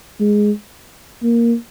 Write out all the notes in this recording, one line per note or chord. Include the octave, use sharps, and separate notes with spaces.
G#3
A#3